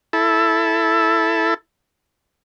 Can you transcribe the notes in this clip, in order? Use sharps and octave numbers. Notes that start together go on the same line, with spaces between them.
E4 A4